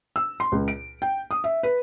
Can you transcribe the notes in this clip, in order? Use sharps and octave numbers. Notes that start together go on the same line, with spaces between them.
E6
C6
C#2
D7
G5
D#6
E5
B4